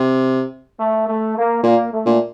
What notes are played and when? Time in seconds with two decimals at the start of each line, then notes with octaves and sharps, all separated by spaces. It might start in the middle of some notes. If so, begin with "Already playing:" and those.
Already playing: C3
0.78 A3
1.07 A3
1.35 A#3
1.63 A#2 A#3
1.91 A3
2.06 A#2